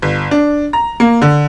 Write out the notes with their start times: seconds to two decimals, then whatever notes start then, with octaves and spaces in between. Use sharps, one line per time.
0.02 G1
0.31 D4
0.73 A#5
1.00 A#3
1.22 D3